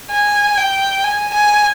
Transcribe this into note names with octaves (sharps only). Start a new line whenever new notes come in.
G#5
G5
G#5
G#5